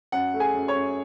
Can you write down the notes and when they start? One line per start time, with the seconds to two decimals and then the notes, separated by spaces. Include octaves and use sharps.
0.12 F#2 F#5
0.34 A3
0.40 G#4 G#5
0.54 F#2
0.68 C#5 C#6
0.75 F#2